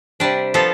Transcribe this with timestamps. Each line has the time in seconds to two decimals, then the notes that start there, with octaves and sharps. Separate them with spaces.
0.20 C3 G3 D4
0.54 F3 B3 F4 A4